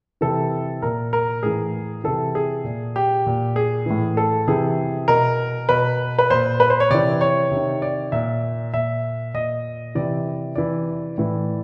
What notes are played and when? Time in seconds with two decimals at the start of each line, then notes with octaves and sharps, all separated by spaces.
0.21 C3 E3 A4
0.82 A#2 A#4
1.13 A#4
1.43 A2 E3 G#4
2.04 C3 E3 A4
2.35 G#4
2.64 A#2
2.96 G4
3.26 A#2
3.56 G#4
3.86 A2 E3
4.17 A4
4.48 C3 E3 G#4
5.08 B2 A#4
5.69 B2 B4
6.19 B4
6.30 A#2 C5
6.60 B4
6.70 C5
6.80 C#5
6.90 C3 E3 D5
7.21 C#5
7.51 C3
7.56 D#3
7.82 D5
8.12 A#2 E5
8.73 A#2 E5
9.34 A#2 D#5
9.95 C3 E3 D5
10.56 C3 E3 D5
11.18 A2 E3